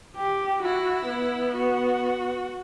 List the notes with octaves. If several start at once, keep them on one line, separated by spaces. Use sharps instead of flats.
G4
E4 F#4
B3
F#4